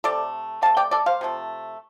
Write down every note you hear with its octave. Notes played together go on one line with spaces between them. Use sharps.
C3 A3 A4 D5
C3 A3 F5 A5
D5 G5
A4 D5
C5 F5
C3 F3 A3